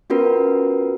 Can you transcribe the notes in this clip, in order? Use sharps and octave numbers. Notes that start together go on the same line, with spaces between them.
B3 C#4 F4 F#4 A#4 B4